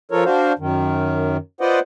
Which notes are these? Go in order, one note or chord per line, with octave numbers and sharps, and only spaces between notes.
F3 F4 A4 A#4 C#5
D4 F#4 C5 F5
F#2 D#3
F4 B4 C5 D5 D#5 F#5